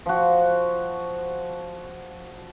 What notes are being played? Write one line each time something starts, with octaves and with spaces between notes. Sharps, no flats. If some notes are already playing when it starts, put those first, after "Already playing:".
F3 F#4